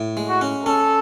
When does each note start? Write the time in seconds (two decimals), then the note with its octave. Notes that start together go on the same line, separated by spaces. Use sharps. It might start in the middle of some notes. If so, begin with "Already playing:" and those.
Already playing: A2
0.17 G#3
0.29 F#4
0.41 C#4
0.65 C#4 A4